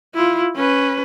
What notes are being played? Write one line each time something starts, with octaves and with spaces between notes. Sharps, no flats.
E4 F4
C#4 B4